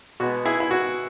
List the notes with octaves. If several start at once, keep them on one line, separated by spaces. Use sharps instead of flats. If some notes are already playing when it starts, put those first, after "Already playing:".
B2 G#3 B3 F#4
E4 G#4
E4
F#4